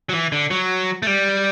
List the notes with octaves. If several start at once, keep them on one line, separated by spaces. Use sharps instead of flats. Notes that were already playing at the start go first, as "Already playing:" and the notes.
F#3
E3
D3
F#3
A3
G3